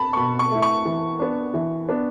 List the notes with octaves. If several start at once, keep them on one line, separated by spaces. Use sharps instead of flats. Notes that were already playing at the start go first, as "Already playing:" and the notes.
Already playing: A5 B5
C#6
B2 B5
C#6
A3 E4
C#6
E3
B3 D4
E3
B3 D4